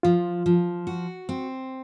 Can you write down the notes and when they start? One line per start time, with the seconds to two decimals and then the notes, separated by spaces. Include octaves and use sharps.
0.03 F3 F4
0.46 F3
0.87 F#4
1.29 C4